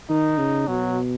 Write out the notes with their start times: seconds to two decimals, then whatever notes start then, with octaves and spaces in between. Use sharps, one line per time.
0.10 D#3 D#4
0.38 C#3
0.68 B2 F#3